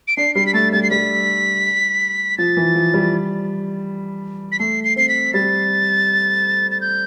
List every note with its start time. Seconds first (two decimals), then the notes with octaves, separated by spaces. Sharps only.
0.08 D7
0.17 D4 C7
0.35 G3 C7
0.46 B6
0.53 A3 A6
0.73 G3 A6
0.83 C7
0.91 G3 B6
2.38 F3 A6
2.57 E3
2.75 F3
2.94 G3
4.52 B6
4.59 A3 C7
4.84 C7
4.96 C4 C7
5.09 B6
5.34 G3 A6
6.71 A6
6.81 G6